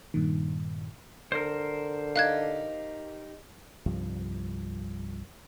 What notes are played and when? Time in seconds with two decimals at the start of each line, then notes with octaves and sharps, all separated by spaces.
0.14 G2 A#2 D#3
1.32 D3 A#4 C5
2.16 D#4 G4 F5 F#6 G#6
3.86 C2 G2 F3